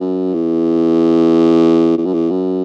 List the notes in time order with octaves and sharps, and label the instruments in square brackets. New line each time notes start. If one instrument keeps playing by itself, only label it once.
[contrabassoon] F#2
E2
E2
F#2
E2
F#2